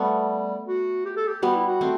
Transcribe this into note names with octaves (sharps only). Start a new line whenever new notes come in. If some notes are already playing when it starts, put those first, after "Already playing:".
Already playing: G3 A3 B3
F#4
G4
A4
G4
G3 B3 F#4
E4
F#4
A3 C4